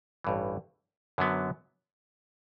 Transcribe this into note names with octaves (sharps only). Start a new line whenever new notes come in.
A1 G2 E3
F#2 D3 F#3 B3